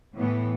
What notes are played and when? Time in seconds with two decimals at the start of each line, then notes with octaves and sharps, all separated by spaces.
0.15 A2 E3 B3